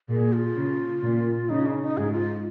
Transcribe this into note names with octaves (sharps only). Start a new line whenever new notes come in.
A#2 G#4
F4
C#3
A#2
C#3 D#4
C#4
D#4
G#2 G#4
F4